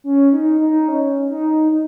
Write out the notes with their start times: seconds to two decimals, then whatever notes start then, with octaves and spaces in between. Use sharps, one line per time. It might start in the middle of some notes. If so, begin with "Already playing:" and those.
0.04 C#4
0.32 D#4
0.60 D#4
0.88 C#4
1.30 D#4